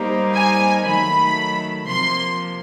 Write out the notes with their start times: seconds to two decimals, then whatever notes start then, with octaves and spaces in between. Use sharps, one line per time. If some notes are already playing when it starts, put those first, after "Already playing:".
Already playing: G3 A#3 D#4 G4 C5
0.34 G#5
0.85 D#3 F#3 A3 B5
1.86 C3 F3 A#3 C6